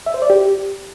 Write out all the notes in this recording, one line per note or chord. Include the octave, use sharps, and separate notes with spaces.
E5
C5
D5
G4